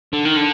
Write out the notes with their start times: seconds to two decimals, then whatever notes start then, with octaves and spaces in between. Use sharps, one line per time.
0.13 D3
0.25 D#3
0.36 D3